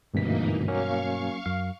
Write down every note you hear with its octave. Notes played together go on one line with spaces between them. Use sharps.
G#1 D2 G2 B2 E3 A#3 D#4 B6
F#3 A#3 C#4 F5 C#6
F#2 F5